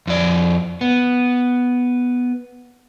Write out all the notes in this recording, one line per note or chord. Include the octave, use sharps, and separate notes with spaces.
F2 D5
B3